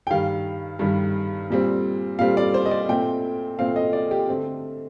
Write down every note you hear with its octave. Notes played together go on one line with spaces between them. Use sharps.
G5
G2 D#3 G3 F5
G2 D#3 G3
A#2 G3 C4
A#2 G3 C4 F5
D5
C5
D#5
D5
A#2 A3 C4 G5
A#2 A3 C4 F5
D#5
D5
G4
D3 A3 C4